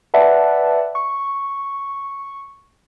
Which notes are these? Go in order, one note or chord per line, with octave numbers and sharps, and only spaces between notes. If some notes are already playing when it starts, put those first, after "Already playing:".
B4 D5 E5 F#5 A5
C#6